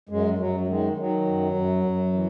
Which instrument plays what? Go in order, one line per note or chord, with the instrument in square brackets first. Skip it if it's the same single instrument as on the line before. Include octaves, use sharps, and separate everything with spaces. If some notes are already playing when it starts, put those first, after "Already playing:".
[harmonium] F#2 G#3
F#2 F#3
F#3
D#3 G#3
D#3 F#3
F#2
F#2
F#2
E3